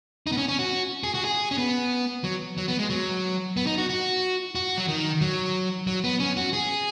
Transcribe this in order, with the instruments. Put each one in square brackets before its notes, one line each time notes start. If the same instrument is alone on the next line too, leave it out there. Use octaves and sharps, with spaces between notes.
[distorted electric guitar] D#4
B3
C#4
C#4
F#4
G#4
F#4
G#4
C#4
B3
F#3
F#3
B3
G#3
F#3
B3
D#4
F#4
F#4
F#4
F#3
D#3
F#3
F#3
B3
C#4
F#4
G#4